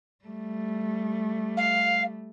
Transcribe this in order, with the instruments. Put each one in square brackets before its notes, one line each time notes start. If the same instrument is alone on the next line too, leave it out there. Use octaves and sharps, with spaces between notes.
[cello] G3 A3
[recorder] F5